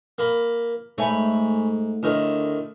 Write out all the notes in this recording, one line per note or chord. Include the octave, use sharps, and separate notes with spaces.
A#3 B5
G#2 A3 C#5 G#5 B5
A2 D3 D#3